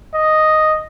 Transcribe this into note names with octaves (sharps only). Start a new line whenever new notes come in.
D#5